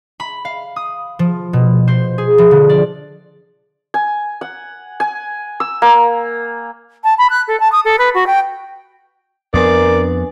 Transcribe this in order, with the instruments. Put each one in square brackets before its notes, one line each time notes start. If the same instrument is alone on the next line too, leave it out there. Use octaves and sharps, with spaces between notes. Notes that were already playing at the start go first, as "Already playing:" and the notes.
[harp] B5
F5
D#6
F3
B2
C5
G#4
F3
D3
D5
[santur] G#5
F#5
G#5
E6
A#3
[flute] A5
B5
F#6
A4
A5
D#6
A4
B4
F#4
G5
[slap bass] F2 B3 [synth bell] D4 B4 G#5 [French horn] A#4 [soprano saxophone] D5